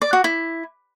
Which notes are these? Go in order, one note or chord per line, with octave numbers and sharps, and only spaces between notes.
D5
F#4
E4